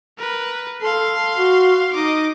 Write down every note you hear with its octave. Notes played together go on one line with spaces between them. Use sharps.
A#4 B4
A4 F5 C6
F#4
D#4 D#5 D6